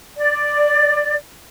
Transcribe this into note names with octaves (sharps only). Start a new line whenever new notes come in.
D5